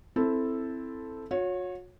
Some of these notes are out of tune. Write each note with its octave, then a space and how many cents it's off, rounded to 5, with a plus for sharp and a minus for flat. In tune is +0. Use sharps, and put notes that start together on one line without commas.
C4 +0 E4 +0 A4 +0
F#4 -40 C#5 +0